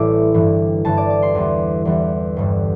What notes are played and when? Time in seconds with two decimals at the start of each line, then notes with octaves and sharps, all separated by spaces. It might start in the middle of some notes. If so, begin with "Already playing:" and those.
Already playing: A1 A2 E3 G3 D6 E6
0.34 G1 G2 E3
0.85 G1 G2 E3 A5
0.97 D5
1.10 D6
1.22 C6
1.35 E2 E3 G3
1.85 E2 E3 G3
2.36 G1 G2 G3